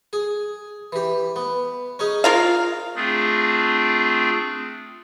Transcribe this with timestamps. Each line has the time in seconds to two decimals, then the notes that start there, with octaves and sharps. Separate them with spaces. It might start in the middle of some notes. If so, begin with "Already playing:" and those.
0.13 G#4
0.92 E3 G4
1.36 B3
1.99 C#4 D#4 G#4
2.24 F4 A#4 F5
2.95 A3 C4 D4 F4 G#4